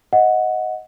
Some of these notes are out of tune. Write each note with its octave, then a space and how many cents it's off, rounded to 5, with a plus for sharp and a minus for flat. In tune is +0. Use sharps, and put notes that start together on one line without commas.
D#5 +15 F#5 -10